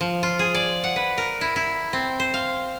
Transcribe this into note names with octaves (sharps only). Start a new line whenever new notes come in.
F3
F4
G#4
D5
F#5
B4
A#4
E4
E4
C4
C5
F5